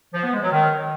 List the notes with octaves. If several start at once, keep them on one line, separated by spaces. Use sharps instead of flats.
F3
B3
G#3
F#3
D#3